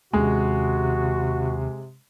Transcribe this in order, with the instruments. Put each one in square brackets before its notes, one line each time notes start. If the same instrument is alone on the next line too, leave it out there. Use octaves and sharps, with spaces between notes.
[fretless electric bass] D#2 C#4 D4 [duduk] C3 [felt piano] G#3 [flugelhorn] F#4